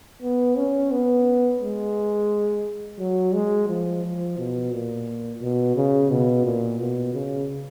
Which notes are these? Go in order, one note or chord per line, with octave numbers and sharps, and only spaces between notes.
B3
C#4
B3
G#3
F#3
G#3
F3
F3
B2
A#2
B2
C#3
B2
A#2
B2
C#3